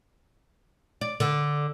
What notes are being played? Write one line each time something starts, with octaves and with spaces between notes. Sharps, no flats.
D5
D3